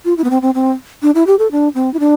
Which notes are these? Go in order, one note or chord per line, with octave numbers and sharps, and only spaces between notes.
F4
E4
B3
C4
C4
C4
D4
E4
G4
A4
D4
C4
E4
D4